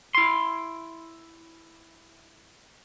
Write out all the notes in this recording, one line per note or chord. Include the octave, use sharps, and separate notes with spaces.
E4 C6